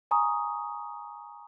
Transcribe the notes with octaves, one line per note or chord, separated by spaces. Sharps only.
G#5 A#5 C#6 D#6